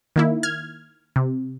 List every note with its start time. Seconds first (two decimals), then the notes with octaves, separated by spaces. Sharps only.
0.16 D#3 A#3 E4
0.43 F6 G#6
1.16 C3